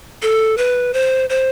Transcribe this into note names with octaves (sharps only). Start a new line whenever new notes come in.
A4
B4
C5
C5